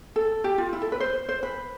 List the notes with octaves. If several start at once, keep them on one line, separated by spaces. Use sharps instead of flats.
A4
G4
F4
E4
A4
B4
C5
C5
B4